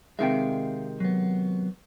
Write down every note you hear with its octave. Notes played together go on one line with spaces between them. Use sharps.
C3 D#3 G#3 E5 F5 G5
F#3 B3